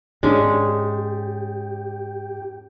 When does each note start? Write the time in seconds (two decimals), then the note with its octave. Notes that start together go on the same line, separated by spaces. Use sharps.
0.23 G#2 G#3 C#4 D4 G4